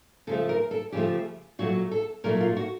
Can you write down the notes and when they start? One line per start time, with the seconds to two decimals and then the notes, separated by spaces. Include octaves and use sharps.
0.27 C#3 F3 A3 A4
0.49 A#4
0.71 A4
0.92 C#3 F3 A3 G4
1.59 A#2 F#3 A3 F#4
1.91 A4
2.24 A#2 F#3 A3 A#4
2.41 F4
2.57 F#4